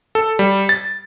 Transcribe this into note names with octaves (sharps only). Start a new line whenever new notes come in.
A4
G3
A6